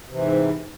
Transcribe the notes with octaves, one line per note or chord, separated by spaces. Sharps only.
G#2 C3 E3